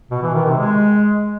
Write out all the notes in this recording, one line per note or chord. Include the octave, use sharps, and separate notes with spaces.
B2
E3
D#3
C3
G#3